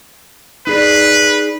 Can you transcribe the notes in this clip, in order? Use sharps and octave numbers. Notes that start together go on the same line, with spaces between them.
D#4 G#4 B4 D5